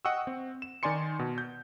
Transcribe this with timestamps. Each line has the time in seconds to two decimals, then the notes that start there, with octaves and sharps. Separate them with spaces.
0.05 D#5 F#5 G5 C#6 D#6 E6
0.27 C4
0.62 E7
0.83 D#3 D#4 D5 G#5 C6 C#7
1.19 B2
1.38 G6